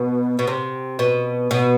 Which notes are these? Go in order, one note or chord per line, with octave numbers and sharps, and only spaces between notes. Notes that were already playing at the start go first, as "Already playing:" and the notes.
Already playing: B2
B2
C3
B2
B2